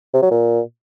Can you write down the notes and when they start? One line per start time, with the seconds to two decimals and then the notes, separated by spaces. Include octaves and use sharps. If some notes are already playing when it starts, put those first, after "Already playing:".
0.13 C3
0.22 F#3
0.31 A#2